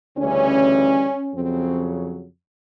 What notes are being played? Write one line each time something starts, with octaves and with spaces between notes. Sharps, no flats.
D2 C#3 E3 G3 C#4
F2 C#3 F#3 C4